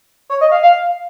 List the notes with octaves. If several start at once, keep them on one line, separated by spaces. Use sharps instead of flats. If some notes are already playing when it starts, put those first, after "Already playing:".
C#5
D#5
F5
F5